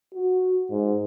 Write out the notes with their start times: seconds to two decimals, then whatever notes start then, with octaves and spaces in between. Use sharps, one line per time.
0.14 F#4
0.71 G#2